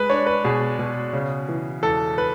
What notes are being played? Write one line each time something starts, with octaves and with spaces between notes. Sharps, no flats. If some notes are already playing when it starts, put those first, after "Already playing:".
Already playing: G#3 B4
D4 C#5
B4
B2 G#4
B2
C#3
E3
E2 A4
B4